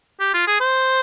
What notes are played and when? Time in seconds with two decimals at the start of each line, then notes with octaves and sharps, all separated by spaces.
0.20 G4
0.34 F4
0.48 G#4
0.61 C5